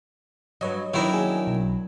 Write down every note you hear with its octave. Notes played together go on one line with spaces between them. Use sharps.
G2 F#3 B4 C#5 D#5
D#3 F#3 C#4 D4 E4
A#3 G#4
B1